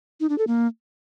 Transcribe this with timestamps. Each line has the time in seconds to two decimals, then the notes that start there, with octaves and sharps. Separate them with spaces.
0.20 D#4
0.29 D4
0.38 A4
0.47 A#3